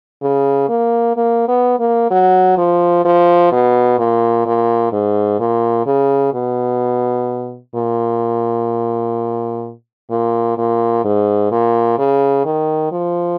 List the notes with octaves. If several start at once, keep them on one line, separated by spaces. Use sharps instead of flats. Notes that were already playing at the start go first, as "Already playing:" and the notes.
C#3
A#3
A#3
B3
A#3
F#3
F3
F3
B2
A#2
A#2
G#2
A#2
C#3
B2
A#2
A#2
A#2
G#2
A#2
C#3
D#3
F3